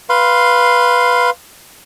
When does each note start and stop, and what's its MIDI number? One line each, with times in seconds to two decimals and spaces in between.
0.09 1.30 71
0.09 1.30 77
0.09 1.30 84